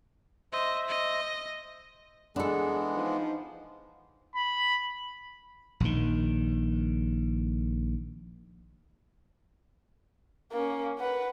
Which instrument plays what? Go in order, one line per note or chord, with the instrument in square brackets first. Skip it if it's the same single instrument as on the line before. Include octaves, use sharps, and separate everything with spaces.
[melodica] C5 E5 [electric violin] D#5
[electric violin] D#5
[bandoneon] E3 G#3 B3 [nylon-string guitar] D4 A4 [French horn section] G#4
[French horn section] F3 D#4
[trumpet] B5
[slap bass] A#1 D#3
[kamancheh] A#3 C#4
B4 F#5